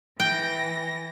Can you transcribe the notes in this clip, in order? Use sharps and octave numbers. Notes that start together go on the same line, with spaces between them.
E3 G5 A#6